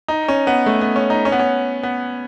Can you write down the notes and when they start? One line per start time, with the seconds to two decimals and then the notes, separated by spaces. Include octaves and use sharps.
0.08 D#4
0.28 C#4
0.47 B3
0.66 A3
0.81 B3
0.96 C#4
1.10 D#4
1.25 C#4
1.32 B3
1.40 C#4
1.83 B3